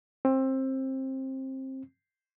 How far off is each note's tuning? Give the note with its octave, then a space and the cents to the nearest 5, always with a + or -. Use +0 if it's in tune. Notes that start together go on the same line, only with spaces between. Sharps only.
C4 +20